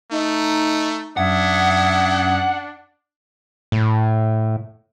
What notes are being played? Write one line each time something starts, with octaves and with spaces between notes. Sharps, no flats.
A3 D#4
F#2 D4 E5 F#5 D#6 G#6
A2